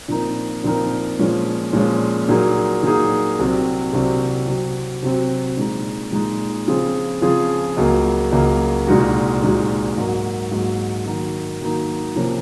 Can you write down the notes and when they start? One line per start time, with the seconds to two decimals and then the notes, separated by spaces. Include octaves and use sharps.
0.08 A#2 F3 C4 D#4 A#4
0.64 A#2 F3 C4 D#4 A#4
1.19 A#2 F3 G#3 C#4
1.73 A#2 F3 G#3 C#4
2.29 A#2 F#3 A#3 D#4 G#4
2.83 A#2 F#3 A#3 D#4 G#4
3.39 C2 C3 F#3 C4
3.93 C2 C3 F#3 C4
4.48 C3 F#3 C4 F#4
5.02 C3 F#3 C4 F#4
5.57 A#2 G#3 D#4
6.12 A#2 G#3 D#4
6.68 C#3 F3 C4 F4 G#4
7.22 C#3 F3 C4 F4 G#4
7.77 C#2 C#3 F#3 A#3
8.32 C#2 C#3 F#3 A#3
8.87 C2 A#2 G#3 D#4 F#4
9.41 C2 A#2 G#3 D#4 F#4
9.97 G#2 F#3 A#3
10.52 G#2 F#3 A#3
11.06 D#3 F#3 A#3 D#4
11.61 D#3 F#3 A#3 D#4
12.16 C3 F3 A#3 C#4